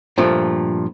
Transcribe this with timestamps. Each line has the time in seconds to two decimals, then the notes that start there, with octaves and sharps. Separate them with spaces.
0.18 G2 A#2 F3 A3